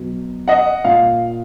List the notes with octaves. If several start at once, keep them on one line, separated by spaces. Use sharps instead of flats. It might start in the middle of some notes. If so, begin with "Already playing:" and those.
Already playing: B2 F#3
D#5 F#5
A#2 F5